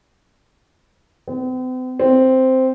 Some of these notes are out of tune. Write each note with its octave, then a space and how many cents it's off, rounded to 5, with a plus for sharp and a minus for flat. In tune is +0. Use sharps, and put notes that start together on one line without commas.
C4 -45
C4 -5